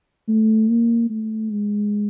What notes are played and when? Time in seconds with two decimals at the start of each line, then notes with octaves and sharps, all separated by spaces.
0.28 A3
0.70 A#3
1.10 A3
1.52 G#3